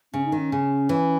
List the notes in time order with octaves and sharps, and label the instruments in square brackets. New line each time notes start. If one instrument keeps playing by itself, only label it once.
[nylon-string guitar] C#3 [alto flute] C#4
[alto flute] D#4
[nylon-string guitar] D#3
[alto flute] C#4
[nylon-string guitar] C#3
E3